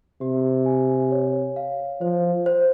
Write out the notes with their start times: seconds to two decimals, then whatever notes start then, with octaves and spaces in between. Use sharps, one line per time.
0.21 C3 G4
0.66 G#5
1.11 C#5
1.56 F5
2.01 F3 C5
2.46 C5